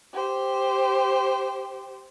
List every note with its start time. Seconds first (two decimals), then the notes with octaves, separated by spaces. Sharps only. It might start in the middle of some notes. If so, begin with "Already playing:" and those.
0.13 G4 C5